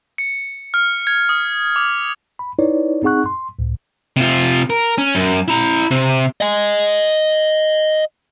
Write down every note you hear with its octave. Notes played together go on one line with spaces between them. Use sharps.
C#7
F6
G#6
D#6
D6
B5
D#4 E4 B4 C#5 D5
C4 D#4 G#4 F#5 C#6 F#6
C6
C#2 A2
C3 F4
A#4
C#4
F#2
E4 A#5
C3
D#5 G#5